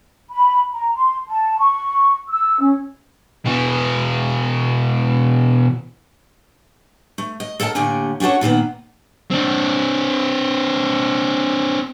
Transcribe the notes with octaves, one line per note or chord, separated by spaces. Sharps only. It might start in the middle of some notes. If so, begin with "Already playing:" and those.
B5
A#5
C6
A5
C#6
E6
C#4
B2 E3
A3
D#5
A4 A#4 D#5 F5 A5
A2 D3 A#3 G4 G#5
C#4 D4 F#4 A4 C#5
A#2 D#3 A#3 B3
C4 D4